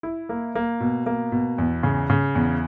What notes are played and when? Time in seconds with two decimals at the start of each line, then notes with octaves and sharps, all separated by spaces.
0.03 E4
0.29 A#3
0.55 A#3
0.80 B2
1.06 A#3
1.32 B2
1.58 E2
1.83 C#3
2.10 C#3
2.35 E2